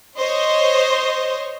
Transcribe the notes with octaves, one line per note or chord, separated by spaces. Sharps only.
C5 C#5 D#5